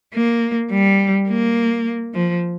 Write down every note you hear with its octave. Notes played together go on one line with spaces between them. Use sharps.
A#3
G3
A#3
F3